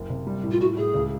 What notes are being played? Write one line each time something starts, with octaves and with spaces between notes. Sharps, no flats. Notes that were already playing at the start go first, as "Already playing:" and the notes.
Already playing: F#1
C3
G3
A2
F4
A2 F#4
A2 G#4
C#2